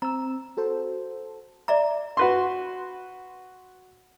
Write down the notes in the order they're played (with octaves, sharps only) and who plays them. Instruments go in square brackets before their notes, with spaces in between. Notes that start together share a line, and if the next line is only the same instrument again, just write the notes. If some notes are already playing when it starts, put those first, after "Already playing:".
[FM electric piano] C4 E6 [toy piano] A#5
[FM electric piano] F#4 A4 C5
[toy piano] D5 E5 A#5 [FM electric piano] D6
[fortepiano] F#4 B4 C6